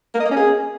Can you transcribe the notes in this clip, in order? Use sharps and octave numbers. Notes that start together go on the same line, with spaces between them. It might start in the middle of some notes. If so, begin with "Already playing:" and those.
A#3
D#5
A#3
C#4
G#4